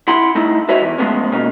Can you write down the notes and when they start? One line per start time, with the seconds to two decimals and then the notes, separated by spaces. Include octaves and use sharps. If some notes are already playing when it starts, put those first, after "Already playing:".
0.08 E4 F#5 B5 C6
0.35 A3 D#4 E4
0.69 F#4 B4 C#5 D#5 E5
0.82 E2 E3
0.98 F3 F#3 G#3 A3 B3 C#4
1.32 B2 A#3 C#4 D#4